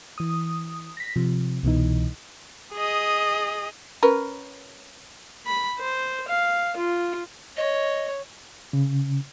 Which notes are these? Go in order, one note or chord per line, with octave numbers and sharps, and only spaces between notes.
E3 D#6
A#6 B6
C3 F3
C2 B2 E3 D#4
G#4 D#5
C#4 A#4 B4
B5
C5
F5
F4
C#5 D#5
C#3